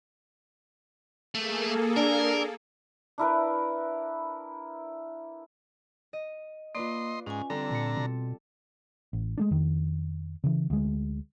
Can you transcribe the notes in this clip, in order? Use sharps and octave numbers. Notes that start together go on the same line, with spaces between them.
A3 A#3 G#4 A4
D4 A#4
D4 E4 A#4 B4
D#5
A#3 F4 B4 D5 D#5 C6
G#2 C#4 G#5
D3 G3 C4 A4 A#5
A#2 A5 A6 C#7
B2
A1
G#3 A3 D4
F2 D#3
C#3 E3
D2 G#3